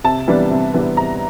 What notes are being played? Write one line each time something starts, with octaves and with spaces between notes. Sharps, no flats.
C3 A5
E3 G3 B3 D4
C3
E3 G3 B3 D4
C3 A#5